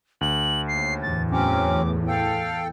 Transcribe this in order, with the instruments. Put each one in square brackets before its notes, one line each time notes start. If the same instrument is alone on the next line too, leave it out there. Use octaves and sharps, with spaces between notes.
[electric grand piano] D2 [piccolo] F#7
[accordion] D#2 [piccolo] C7
[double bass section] E2 A2 E3 [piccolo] A6
[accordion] F#3 C4 C#4 [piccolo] D6
[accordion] A4 G5 [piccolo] F5